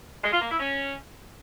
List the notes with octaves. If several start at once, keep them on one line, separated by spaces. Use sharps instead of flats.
G#3
F4
A#3
E4
C#4